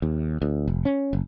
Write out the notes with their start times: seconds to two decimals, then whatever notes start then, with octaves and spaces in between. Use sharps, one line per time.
0.02 D#2
0.42 D2
0.68 F1
0.85 C#4
1.13 F#1